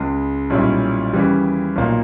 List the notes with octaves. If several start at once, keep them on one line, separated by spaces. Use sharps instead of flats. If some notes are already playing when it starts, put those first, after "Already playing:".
Already playing: C#2 C#3 G#3
B1 A#2 G3 C#4 E4
D#2 C#3 E3 G3
B1 A#2 A#3